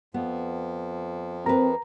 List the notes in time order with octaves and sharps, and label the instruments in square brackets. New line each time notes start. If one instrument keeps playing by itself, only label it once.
[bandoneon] F2 F3 [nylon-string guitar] B3
[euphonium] C4 [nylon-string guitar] A#4 B4 [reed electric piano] A#5